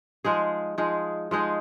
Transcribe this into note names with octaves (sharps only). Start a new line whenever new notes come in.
F3 G#3 D#4 G#4
F3 G#3 D#4 G#4
F3 G#3 D#4 G#4